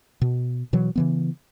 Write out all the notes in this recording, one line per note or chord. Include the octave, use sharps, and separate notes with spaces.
B2
B2 E3 F#3
C#3 E3 B3